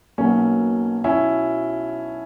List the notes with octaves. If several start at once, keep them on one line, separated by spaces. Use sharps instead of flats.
B1 B2 F#3 A#3 C#4
C#4 E4